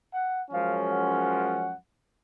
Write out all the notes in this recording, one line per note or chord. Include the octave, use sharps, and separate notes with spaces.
F#5
F#2 F3 G#3 C#4 F5
F#5